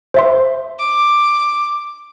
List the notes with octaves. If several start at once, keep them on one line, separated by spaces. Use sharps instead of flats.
C5 E5 C6
D6